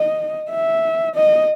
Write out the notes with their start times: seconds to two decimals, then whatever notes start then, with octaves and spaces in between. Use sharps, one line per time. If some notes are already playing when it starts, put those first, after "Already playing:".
Already playing: D#5
0.50 E5
1.15 D#5